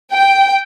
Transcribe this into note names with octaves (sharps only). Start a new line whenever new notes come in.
G5